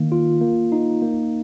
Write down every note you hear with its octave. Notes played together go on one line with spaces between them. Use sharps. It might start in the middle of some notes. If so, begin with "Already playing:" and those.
Already playing: D#3 A#3
F4
A#3
D#4
A#3